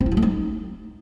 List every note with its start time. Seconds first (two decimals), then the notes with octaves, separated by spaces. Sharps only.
0.01 C4
0.06 E4
0.12 F#3
0.17 A3
0.22 D#4